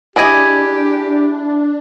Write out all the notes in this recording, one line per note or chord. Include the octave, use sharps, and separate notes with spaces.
D4 E4 G4 G#4 D5 D#5 G#5